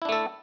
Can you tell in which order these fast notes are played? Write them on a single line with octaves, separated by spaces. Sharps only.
E4 D4 A3 A4